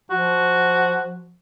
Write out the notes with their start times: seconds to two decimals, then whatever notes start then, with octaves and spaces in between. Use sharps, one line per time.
0.10 F3 F#4